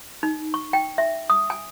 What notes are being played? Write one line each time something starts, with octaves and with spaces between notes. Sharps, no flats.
D#4
C#6
G5
E5
D#6
G#5